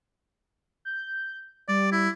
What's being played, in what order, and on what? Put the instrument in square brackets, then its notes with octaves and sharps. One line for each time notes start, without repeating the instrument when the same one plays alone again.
[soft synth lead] G6
[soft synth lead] G3 [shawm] D5
[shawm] E4